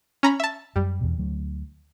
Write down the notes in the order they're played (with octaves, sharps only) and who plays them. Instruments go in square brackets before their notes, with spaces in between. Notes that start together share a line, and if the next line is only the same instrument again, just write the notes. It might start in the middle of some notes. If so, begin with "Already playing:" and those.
[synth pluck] C#4 A#5 B5
E5 A5
[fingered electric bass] F#2 [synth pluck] G3
[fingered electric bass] E2 B2
D2 F#3